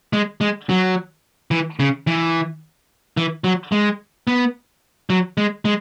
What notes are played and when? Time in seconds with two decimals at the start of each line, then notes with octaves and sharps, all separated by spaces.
0.13 G#3
0.41 G#3
0.69 F#3
1.51 E3
1.80 C#3
2.07 E3
3.17 E3
3.44 F#3
3.72 G#3
4.27 B3
5.10 F#3
5.38 G#3
5.65 G#3